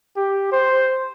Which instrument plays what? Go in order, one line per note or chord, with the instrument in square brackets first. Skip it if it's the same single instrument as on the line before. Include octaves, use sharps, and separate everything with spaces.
[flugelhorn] G4
C5